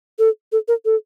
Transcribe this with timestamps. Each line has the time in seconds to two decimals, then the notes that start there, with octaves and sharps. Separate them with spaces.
0.19 A4
0.52 A4
0.68 A#4
0.85 A4